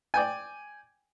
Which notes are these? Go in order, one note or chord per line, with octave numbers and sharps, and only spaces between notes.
D5 G5 G#5